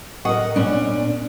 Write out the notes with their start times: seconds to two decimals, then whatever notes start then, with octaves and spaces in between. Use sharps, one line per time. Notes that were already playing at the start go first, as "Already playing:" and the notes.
0.25 A2 A#4 D#5 F#5 D#6
0.56 A#2 B3 C#4 D4 D5